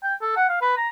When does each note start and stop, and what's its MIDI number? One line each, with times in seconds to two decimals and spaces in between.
0.03 0.15 79
0.22 0.33 69
0.36 0.45 78
0.49 0.59 77
0.62 0.73 71
0.77 0.89 82